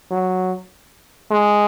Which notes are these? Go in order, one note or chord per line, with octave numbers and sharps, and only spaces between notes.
F#3
G#3